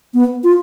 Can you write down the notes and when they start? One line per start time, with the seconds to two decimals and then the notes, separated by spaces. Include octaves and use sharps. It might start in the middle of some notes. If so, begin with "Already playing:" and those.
0.14 B3
0.44 F4